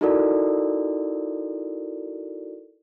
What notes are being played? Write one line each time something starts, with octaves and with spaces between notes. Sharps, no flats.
D#4 E4 F#4 A4 A#4 D5